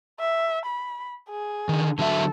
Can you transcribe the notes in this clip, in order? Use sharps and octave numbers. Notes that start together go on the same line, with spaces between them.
E5
B5
G#4
D3 D#3
D3 F#3 A4 E5